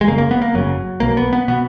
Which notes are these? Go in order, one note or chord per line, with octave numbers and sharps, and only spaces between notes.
G#3
F#1 F#2 C#3 A#3
A#3
B3
A#3
F#1 F#2 C#3 F#3
B1 B2 A#3
B3
B3
B2 B3